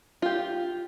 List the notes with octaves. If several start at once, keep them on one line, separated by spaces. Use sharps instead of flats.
F4 G4